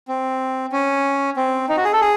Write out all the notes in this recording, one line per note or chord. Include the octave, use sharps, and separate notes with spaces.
C4
C#4
C4
D#4
F#4
G#4
A4
G#4